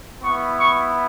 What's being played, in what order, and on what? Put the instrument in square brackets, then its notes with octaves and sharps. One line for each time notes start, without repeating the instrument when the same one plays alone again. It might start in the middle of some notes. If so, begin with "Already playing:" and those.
[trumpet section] B3 E4 C#6
C#6